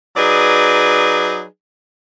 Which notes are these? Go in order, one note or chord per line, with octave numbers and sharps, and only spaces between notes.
F#3 D#4 G#4 B4 D5